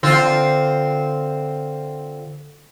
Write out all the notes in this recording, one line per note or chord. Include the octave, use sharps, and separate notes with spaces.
D3 C4 F4